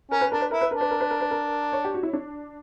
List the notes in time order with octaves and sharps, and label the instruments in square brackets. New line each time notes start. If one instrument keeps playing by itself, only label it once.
[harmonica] C#4 [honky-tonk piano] A#4
[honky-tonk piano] B4
[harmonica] D4 [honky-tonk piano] A#4
[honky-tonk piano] B4
[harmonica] E4 [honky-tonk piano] A#4
[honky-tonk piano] B4
[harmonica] D4 [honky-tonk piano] A#4
[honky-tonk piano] B4
A#4
B4
A#4
B4
A#4
C#5
G4
F#4
E4
D4